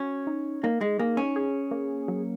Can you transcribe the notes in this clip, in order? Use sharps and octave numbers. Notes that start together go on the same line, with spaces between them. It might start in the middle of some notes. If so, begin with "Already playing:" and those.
Already playing: C#4 F#4
D#4
A#3 D#4
G#3
A#3 G#4
C#4
G#4
A#3
F#3